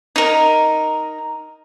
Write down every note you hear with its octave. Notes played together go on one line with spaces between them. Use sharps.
D#4 A#4